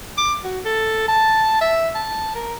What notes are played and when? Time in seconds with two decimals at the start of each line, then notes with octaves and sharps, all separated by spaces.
0.18 D6
0.44 F#4
0.65 A4
1.08 A5
1.61 E5
1.95 A5
2.35 A#4